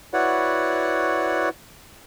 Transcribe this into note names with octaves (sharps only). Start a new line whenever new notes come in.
E4 F#4 B4 C#5 D5 F#5